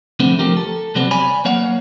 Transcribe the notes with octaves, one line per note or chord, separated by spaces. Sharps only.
C2 F2 D3 A3 B3 C4
F3 A3 G4 A#4
A4
C3 F#3 G3 B3 C4
C#5 D5 G#5 B5
F#3 A#3 C#5 F5 F#5